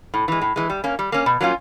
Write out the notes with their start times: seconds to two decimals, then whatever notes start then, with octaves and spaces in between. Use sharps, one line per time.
0.14 A2
0.28 E3 G#3
0.42 A2
0.56 E3 G#3
0.70 G3
0.84 A#3 C#4
0.99 G3
1.12 A#3 C#4
1.26 B2
1.41 F#3 A#3 C#4 F4